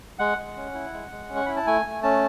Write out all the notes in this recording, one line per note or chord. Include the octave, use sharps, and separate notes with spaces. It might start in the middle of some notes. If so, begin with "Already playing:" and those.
G#3 F#5
G#3
C#4
E4
G#3
G#3
C#4
C#6
E4 B5
A5
A3 G#5
A3
C#4 A5